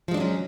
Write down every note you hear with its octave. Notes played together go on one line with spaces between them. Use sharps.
F3 F#3 G#3 C#4 D4